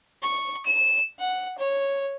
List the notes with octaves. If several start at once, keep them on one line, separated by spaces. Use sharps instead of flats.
C#6
E7
F#5
C#5